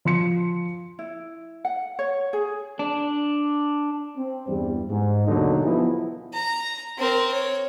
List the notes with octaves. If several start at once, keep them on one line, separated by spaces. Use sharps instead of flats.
F3 C6 C#7
E4
F#5
C#5
G#4
D4
C4
E2 G2 G3
G#2
D#2 B2 D3 F#3 D4 D#4
F3 B3 E4 G#4
A#5
C4 A#4
C#5